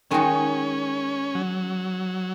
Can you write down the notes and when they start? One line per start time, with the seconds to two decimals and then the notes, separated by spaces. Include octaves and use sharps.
0.11 D#3 G#3 C#4 D#4 F#4
1.35 F#3